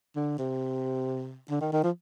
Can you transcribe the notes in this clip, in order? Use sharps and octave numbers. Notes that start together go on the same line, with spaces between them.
D3
C3
D3
D#3
D#3
F3